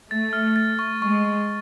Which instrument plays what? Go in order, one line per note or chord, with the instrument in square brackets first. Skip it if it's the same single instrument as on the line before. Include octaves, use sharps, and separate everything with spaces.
[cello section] A3 [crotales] A6
[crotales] F6
A6
C#6
[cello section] G#3 [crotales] C#6
[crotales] C#6